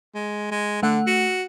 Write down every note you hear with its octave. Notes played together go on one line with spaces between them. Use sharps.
G#3
G#3
D3 A3 F#5
F#4